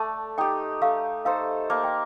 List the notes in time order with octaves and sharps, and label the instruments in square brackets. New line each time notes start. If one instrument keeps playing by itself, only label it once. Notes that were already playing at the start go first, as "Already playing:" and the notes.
Already playing: [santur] A3 D5 [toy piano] A5
[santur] D#4 G4 [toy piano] G5
[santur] A3 [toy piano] F5
[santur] D#4 A4 C5 [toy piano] F5
[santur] A#3 [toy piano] A5
[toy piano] G5